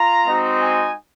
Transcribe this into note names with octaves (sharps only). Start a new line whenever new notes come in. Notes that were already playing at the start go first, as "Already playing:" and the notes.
Already playing: F4 A#5
G#3 C4 D#4 F#4
G#5